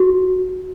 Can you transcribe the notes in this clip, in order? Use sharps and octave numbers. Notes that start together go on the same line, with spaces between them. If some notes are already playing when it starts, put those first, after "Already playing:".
Already playing: F#4